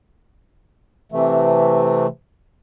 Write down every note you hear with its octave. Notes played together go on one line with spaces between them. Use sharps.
C3 E3 A3